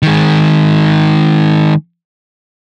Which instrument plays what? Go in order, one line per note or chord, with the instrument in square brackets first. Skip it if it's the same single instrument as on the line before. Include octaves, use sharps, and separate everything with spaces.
[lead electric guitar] D#3 G#3